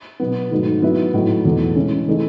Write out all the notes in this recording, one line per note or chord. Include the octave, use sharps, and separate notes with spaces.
B2 F#3 B3
G#2 D#3 F#3 A3
F#3 B3 E4 B4 E5
A2 F#3 A3 D#4
E2 B2 A3
C#3 E3 G#3 C#4
C#3 E3 A3 D#4 G#4